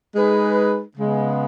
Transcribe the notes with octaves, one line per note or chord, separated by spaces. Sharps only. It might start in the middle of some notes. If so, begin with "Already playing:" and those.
G#3 D#4 G#4 B4
C#3 G#3 B3